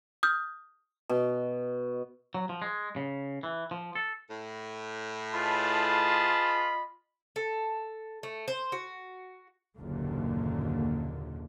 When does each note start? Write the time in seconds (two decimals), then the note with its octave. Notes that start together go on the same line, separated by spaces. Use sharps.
0.23 D#6 F6 G6
1.09 B2
2.34 F#3
2.49 F3
2.62 G#3
2.96 C#3
3.43 E3
3.71 F3
3.95 A4
4.30 A2
5.35 F4 G#4 B4 D#5 A5 B5
7.36 A4
8.23 A3
8.48 C5
8.72 F#4
9.77 F#1 D#2 A#2 D3